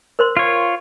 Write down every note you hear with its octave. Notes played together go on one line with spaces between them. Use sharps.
A#4 C5 C6
F4 C#5